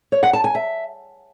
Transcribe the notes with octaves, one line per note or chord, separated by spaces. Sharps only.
C#5
F#5
A5
G#5
E5